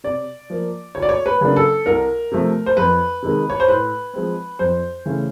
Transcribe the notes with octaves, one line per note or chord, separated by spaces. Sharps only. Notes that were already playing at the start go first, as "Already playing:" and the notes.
C3 D5
F3 A#3
D2 C#5
D5
C#5
B4
C#3 F#3 A#3 D4
A4
C2 A#4
C3 F3 A3
C5
F2 B4
C3 D#3 G#3
C#5
C5
A2 B4
F3 G#3 C4
F2 C5
C#3 E3 A3 C#4